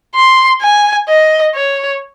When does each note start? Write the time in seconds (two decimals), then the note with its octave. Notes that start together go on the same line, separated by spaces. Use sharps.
0.15 C6
0.62 G#5
1.09 D#5
1.55 C#5